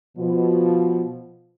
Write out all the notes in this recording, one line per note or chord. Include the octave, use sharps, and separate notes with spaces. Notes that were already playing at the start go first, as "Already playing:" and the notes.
B2 F3